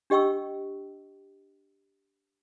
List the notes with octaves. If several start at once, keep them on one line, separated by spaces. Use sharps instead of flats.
D4 G4 D#5 G5 C#6 E6